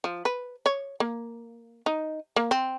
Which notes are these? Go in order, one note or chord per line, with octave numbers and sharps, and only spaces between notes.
F3
B4
C#5
A#3
D#4
A#3
C4